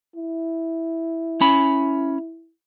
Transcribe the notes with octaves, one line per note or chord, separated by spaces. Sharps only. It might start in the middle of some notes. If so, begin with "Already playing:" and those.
E4
C#4 B5